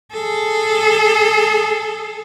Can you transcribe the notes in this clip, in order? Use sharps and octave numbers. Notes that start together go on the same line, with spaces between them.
G#4 A4